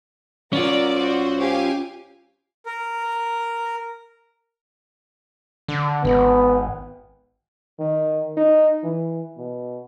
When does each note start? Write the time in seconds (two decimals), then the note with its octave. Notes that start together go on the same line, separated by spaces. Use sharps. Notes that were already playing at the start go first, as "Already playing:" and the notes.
0.53 C#4 F4 F#4 A#4 D5
0.95 F#4 C5
1.39 G4 F5 G#5
2.66 A#4
5.68 D3
6.05 G#1 B3
7.79 D#3
8.37 D#4
8.84 E3
9.37 B2